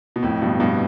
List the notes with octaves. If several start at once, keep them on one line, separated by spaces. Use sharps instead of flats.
B2
F2 A2
G2 B2
G2 B2